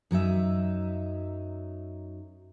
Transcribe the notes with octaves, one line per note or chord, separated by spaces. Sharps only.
F#2 F#3 D#4 E5